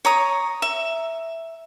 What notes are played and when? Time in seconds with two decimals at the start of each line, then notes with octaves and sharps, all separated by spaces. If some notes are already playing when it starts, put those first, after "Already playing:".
0.05 C#5 A#5 D#6
0.62 E5